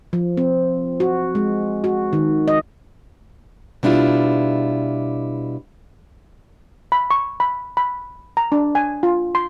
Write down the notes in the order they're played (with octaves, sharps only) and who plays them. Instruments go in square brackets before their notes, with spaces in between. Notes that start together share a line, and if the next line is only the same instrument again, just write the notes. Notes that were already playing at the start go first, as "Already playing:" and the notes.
[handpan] F3
C4
F#4
G#3
F#4
D#3
D#5
[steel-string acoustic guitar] B2 G3 D4 E4 F4
[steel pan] B5
C#6
B5
B5
A#5
D4
G#5
F4
C6